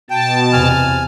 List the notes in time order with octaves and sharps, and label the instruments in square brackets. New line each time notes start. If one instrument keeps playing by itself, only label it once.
[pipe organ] B2 A5 [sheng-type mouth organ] G5
[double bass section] E2 C3 [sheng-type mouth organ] G#5 F6